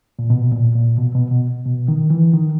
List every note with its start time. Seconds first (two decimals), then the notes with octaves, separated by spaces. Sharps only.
0.19 A#2
0.30 B2
0.52 A#2
0.75 A#2
0.98 B2
1.15 B2
1.31 B2
1.66 B2
1.88 D#3
2.10 E3
2.33 D#3